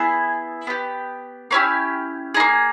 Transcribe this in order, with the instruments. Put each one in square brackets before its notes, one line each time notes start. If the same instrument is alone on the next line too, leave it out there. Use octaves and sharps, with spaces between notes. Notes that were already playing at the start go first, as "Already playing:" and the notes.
Already playing: [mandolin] B3 E4 G#4 G#5
B3 G4
A#3 C#4 E4 G4
D#4 G#4
A#3